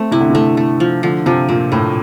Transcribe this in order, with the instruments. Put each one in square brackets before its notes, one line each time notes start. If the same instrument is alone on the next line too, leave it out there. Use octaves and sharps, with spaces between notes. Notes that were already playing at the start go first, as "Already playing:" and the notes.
Already playing: [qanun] A3 C4
[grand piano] C3 [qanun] E4
[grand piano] D3
[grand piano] C3 [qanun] A3
[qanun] A3
F3
[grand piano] D3 [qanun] F3
[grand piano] C3 [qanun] F3
[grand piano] A#2 [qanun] C4
[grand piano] A2 [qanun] A3